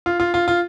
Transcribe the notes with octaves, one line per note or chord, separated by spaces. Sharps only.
F4
F4
F4
F4